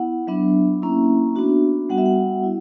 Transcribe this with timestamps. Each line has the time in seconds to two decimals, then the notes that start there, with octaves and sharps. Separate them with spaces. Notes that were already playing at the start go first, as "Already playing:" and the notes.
Already playing: B3 E4 F#5
0.27 F#3 B3 D4 E5
0.82 A#3 C#4 E4
1.36 B3 D4 F#4
1.89 G3 B3 F#4 F#5
1.98 E5
2.06 F#5
2.43 E4